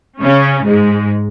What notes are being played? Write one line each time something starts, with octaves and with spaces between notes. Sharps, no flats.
C#3 C#4
G#2 G#3